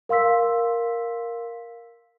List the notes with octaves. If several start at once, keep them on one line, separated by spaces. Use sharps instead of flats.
A#4 F5 C6 E6 B6